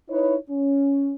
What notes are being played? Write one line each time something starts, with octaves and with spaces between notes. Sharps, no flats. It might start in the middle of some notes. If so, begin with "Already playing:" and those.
D#4 E4 B4 C#5
C#4